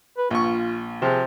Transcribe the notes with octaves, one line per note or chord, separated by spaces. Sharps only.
B4
A#1 F4 C#6
C3 F3 G#4